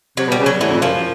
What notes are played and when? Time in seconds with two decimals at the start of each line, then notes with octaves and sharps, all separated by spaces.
0.17 C3 F#3
0.28 B2 G3
0.39 C#3
0.46 F#3
0.60 A2 E3
0.72 F2
0.82 F#2 F3